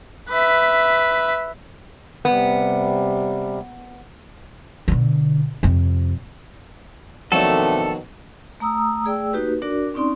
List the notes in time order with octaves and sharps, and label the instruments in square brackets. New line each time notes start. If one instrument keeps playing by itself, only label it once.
[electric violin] B4 E5
[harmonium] C3 G3 [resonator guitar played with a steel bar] B3
[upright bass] B2 D3
F2 C3
[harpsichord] F2 F#3 [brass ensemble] B2 D#3 [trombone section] A3 C4 D4 [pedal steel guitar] A4
[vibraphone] A3 A#5 D#6 E6
A3 G#4 D5 G5 E6
A#3 D#4 F#4 G4 B4
D4 F#4 A#4 D5
C4 C#4 D#4 D5 C6